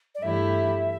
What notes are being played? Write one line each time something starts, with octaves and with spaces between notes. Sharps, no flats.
D5
G2 E3 A3 E4 G4 E5